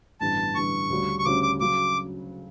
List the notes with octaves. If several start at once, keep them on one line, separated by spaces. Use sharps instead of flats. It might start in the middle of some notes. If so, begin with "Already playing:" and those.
A1 G2 D3 G3 B3 A5
A1 G2 D3 G3 B3 C#6
D2 C#3 G3 C#4 F#4
C#6
D2 C#3 G3 C#4 F#4 D6
D6
C#3 F#3 D6